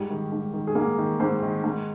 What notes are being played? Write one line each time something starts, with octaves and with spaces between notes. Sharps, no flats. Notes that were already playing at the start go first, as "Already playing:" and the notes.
Already playing: G#2 G3 G4
D#3
G#2
D#3
G#4
G#2 A#3 A#4
D#3
G#2 C4 C5
D#3
G#2